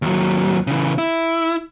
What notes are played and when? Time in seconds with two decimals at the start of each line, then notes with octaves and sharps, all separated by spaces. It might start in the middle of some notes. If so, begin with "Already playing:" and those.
0.02 D#2 F#3
0.67 C#3 E3
0.98 E4